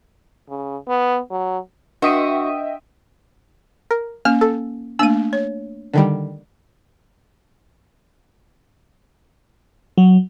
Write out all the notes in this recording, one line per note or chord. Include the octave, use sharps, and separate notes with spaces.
C#3
B3
F#3
D4 F#4 D#5 E5 G5 D#6 D#7
A#4
A#3 C#4 F6
A4
A3 A#3 D4 E6 D#7
C#5
D3 D#3 G3
F#3